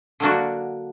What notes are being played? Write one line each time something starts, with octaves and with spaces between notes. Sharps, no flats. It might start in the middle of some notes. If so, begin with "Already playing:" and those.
D3 F#3 A#3 D4 F#4